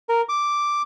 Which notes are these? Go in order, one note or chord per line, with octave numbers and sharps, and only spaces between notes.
A#4
D6